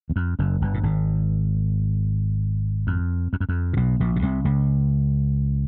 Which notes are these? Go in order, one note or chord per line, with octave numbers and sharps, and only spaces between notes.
E2
F2
F#1 F#2
G1 G2
A2
G#1 G#2
F2
F2
F#2
F2
A#2
B1 B2
A#1 A#2
B2
C2 C3
C#2 C#3